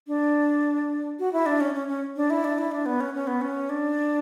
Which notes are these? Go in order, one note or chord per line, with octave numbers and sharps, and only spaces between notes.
D4
F#4
E4
D4
C#4
C#4
C#4
D4
E4
D4
E4
D4
B3
C#4
C#4
B3
C#4
D4